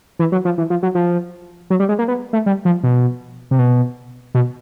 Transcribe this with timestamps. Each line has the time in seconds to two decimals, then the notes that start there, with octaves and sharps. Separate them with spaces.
0.19 E3
0.32 F#3
0.45 F3
0.58 E3
0.70 F3
0.83 F#3
0.95 F3
1.70 F#3
1.80 G3
1.89 G#3
1.99 A#3
2.08 B3
2.33 A3
2.46 G3
2.65 F3
2.83 B2
3.51 C3
3.59 B2
4.34 B2